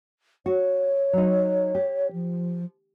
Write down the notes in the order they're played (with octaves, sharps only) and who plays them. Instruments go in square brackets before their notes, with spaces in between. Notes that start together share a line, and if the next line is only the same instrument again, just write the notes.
[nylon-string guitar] F#4 [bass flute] C#5
[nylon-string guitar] F#3 D#4
G4
[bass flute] F3